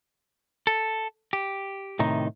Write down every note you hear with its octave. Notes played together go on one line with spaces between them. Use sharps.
A4
G4
A2 C3 D#3 D#4